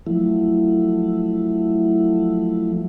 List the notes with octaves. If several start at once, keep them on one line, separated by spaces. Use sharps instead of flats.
F3 F#3 A3 E4